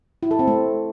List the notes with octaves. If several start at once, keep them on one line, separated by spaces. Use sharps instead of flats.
E4
A4
C4
A3